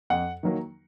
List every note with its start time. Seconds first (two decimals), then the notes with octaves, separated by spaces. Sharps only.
0.10 F2 F#5
0.43 D#3 F#3 A#3